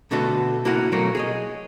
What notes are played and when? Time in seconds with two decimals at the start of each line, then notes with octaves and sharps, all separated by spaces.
0.11 B2 D3 A3 B3 F#4 A4
0.65 A#3 E4 F#4 A#4 F#5
0.92 B2 F#3 A3 A#3 A#4 C#5
1.15 G#4 C#5 D#5